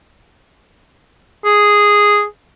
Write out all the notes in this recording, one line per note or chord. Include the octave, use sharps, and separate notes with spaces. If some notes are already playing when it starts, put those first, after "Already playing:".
G#4